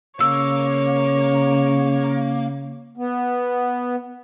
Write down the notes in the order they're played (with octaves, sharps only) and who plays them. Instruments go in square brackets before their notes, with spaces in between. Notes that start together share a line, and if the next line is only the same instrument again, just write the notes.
[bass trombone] C#3 [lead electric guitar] A#3 [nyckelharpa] C#5 [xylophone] E6
[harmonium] B3